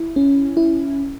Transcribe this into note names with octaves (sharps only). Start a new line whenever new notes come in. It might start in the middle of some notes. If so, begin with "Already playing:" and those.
Already playing: E4
C#4
E4